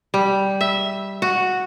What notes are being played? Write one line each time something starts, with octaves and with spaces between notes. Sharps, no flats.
G3
E5
F#4